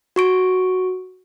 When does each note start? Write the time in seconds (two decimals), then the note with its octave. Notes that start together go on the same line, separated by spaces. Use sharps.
0.16 F#4 C#6 D7